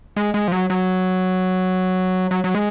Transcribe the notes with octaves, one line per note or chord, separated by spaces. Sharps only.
G#3
G#3
F3
F#3
F#3
F#3
F#3
G#3